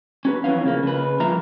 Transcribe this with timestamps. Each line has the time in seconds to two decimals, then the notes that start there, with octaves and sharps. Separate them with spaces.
0.25 C#4 F#4 B4
0.44 F2 E3 F#3 C#4 F5
0.64 C#3 F3 A#3
0.83 C#3 B4
1.20 G2 F3 A#3 F4 E5 A#5